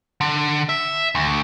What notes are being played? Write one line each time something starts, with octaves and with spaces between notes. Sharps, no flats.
D3
E5
D2